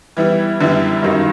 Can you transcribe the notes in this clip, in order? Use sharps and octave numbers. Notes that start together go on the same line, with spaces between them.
E3 G3 B3 E4
F#2 D3 G3 B3 E4
G2 D#3 F#3 A#3 D#4